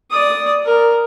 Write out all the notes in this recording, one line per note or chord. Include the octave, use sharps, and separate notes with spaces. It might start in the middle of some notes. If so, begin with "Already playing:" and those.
D5 D#6
A#4